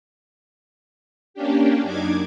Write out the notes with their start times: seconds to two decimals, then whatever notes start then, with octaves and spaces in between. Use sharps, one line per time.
1.34 A#3 C#4 D4 G4
1.83 F#2 D4 D#4 D6 G#6